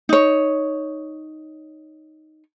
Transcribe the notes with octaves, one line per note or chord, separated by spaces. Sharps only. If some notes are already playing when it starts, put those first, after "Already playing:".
D#4 C#5